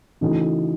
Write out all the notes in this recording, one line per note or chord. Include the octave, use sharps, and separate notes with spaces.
C#3 E3 A3 D#4 F#4